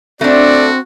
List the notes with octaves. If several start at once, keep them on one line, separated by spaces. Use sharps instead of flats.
A3 C4 D4 F#4 D5